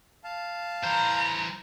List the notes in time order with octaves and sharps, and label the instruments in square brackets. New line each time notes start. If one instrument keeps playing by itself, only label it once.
[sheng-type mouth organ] F5 A5
[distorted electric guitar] E3 C5 [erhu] A#5